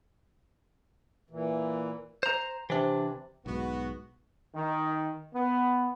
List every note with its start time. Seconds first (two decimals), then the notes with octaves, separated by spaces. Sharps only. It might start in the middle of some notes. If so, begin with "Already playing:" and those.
1.31 A#2 E3
2.23 C5 A#5
2.70 C3 E3 D4
3.46 B1 G#2 B3 F#4
4.55 D#3
5.34 B3